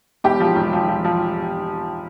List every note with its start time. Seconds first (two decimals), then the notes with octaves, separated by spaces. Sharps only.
0.24 E1 G4
0.40 F3
0.56 E1
0.73 F3
0.88 F3
1.04 F3